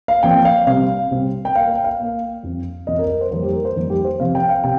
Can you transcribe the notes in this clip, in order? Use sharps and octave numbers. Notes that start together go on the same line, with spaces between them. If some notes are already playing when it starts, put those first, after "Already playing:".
F5
A#2 F3 C4 G5
F5
C3 G3 C4 F5
C3 G3 C4
G5
A#2 A#3 F5
G5
F5
A#2 A#3
F2 F3 C4
F2 F3 C4 D#5
A#4
A#4
C5
F2 D#3 G3 A#3 C5
G4
A#4
C5
F2 D#3 G3 A#3
G4
C5
C3 F3 C4 F5
G5
F5
C3 G5